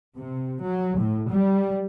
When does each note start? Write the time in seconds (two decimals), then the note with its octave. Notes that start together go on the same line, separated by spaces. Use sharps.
0.16 C3
0.62 F#3
0.98 A2
1.30 G3